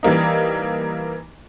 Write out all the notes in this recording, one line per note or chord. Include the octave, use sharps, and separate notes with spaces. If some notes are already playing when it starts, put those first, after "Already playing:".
E3 G3 A#3 D#4